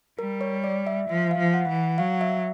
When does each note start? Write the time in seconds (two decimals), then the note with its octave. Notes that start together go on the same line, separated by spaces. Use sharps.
0.19 G3 A#4
0.41 C#5
0.64 D5
0.87 E5
1.09 F3 E5
1.31 F5
1.39 F3
1.54 F#5
1.69 E3
1.76 F#5
1.98 F#3 F5
2.21 E5